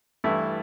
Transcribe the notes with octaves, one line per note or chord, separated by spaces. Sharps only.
G2 E3 A3 E4